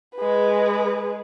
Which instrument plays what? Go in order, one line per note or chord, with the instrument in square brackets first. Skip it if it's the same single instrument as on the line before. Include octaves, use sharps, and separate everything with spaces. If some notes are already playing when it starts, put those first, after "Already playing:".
[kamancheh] G#3 B4